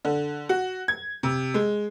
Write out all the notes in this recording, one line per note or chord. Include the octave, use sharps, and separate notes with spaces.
D3
F#4
G#6
C3
G#3